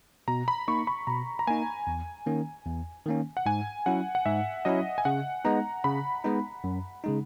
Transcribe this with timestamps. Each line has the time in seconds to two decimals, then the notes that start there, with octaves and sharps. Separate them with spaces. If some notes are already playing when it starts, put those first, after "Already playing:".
0.28 B2 A#5
0.48 B5
0.68 A#3 D#4 C#6
0.87 B5
1.07 B2 A#5
1.39 A#5
1.47 A#3 D#4 G#5
1.87 E2
2.26 D#3 A#3 C#4
2.66 E2
3.06 D#3 A#3 C#4
3.37 F#5
3.46 G#2 G#5
3.86 F#3 C#4 E4 F#5
4.15 F#5
4.26 G#2 E5
4.65 F#3 C#4 E4 D#5
4.98 G#5
5.05 C#3 F#5
5.45 G#3 B3 D#4 A#5
5.84 C#3 B5
6.24 G#3 B3 D#4
6.64 F#2
7.04 C#3 G#3 D#4